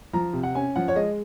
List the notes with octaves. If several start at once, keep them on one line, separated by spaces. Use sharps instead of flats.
F3 A#5
C3
F#5
C#4 G#5
F3 F#5
C#5
G#3 D#5